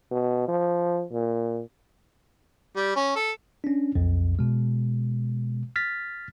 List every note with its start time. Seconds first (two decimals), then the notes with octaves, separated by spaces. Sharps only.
0.11 B2
0.48 F3
1.12 A#2
2.76 G3
2.96 C#4
3.16 A4
3.64 C#4 D4
3.95 B1 F2
4.39 B2 G#3
5.76 F6 A6 B6